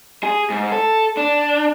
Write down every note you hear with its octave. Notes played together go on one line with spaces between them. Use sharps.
G#4
G#2
A4
D4